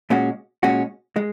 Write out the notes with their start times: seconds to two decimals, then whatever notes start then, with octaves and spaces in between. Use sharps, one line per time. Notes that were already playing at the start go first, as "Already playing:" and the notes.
0.10 A#2 G#3 C#4 F#4
0.63 A#2 G#3 C#4 F#4
1.16 G#3